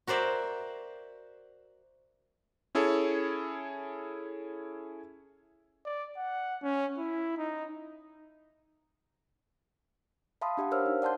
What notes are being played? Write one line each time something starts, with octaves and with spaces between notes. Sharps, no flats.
F#4 A#4 C5 D5 E5
C#4 E4 G#4 A4 C#5
D5
F#5
C#4
E4
D#4
E5 F5 A5 B5 C6 D#6
D4 G4 E5 F#5
A#4 C5 C#5 F5 E6 F6
D#4
D5 F#5 A5 C6 G6